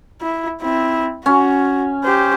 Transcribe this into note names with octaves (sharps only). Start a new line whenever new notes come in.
E4
C4 E4
C#4 F#4
G4 C5